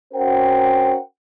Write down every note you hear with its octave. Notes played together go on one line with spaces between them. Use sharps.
C#4 F#4 A#4 C5 F#5 G5